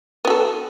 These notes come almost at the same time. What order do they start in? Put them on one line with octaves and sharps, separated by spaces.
B3 F#3 A4